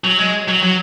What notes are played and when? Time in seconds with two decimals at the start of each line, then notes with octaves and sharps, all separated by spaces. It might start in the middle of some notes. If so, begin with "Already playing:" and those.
0.04 F#3
0.18 G#3
0.48 F#3
0.62 F#3